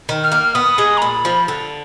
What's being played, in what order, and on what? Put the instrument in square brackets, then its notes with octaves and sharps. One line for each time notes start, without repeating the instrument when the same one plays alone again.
[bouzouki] D#3
[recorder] F6
[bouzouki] A#3
[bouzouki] B3 [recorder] D#6
[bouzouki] G#3
[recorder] A#5
[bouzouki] A#2 [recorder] B5
[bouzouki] F3
D3